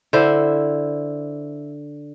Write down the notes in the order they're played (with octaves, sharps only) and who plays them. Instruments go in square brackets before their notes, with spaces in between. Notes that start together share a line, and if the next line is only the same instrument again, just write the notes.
[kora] D3 E4 C5